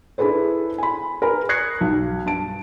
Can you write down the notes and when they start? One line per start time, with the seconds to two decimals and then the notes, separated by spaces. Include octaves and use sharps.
0.18 D4 E4 G#4 A4 B4 C5
0.78 G#5 B5
1.22 A#4 B4 G#5 B5
1.49 D#6 F#6 G#6 A#6 C7 C#7
1.81 B1
2.26 G2 A5 D7